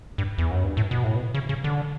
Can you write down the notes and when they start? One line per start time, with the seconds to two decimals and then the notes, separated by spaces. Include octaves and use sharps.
0.18 G2
0.38 E2
0.51 F#2
0.64 G2
0.77 A2
0.91 B2
1.04 A2
1.16 B2
1.34 C#3
1.49 C#3
1.64 D3